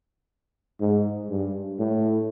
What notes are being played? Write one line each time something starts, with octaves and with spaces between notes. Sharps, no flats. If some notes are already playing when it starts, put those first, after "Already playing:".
G#2
G2
A2